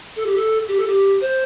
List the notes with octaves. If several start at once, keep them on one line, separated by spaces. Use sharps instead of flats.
A4
G4
A4
G4
A4
G4
C5